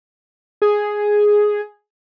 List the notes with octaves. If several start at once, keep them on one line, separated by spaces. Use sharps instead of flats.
G#4